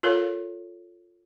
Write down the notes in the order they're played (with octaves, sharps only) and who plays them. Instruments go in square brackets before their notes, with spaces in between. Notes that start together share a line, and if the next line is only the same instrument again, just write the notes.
[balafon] F4 A4 A#4 C#5 F5